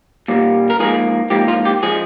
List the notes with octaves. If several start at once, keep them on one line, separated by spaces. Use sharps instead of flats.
A#2 G3 A#3
A#4
G#2 F3 A#3 G#4
G#2 F3 A#3 G4
F4
G4
F3 G#3 G#4